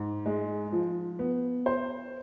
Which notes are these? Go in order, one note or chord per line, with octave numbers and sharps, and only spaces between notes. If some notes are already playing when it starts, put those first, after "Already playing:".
Already playing: G#2
G#3
F3
B3
C5